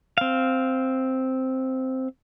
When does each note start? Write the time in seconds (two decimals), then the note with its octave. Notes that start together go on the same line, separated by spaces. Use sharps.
0.18 C4 F5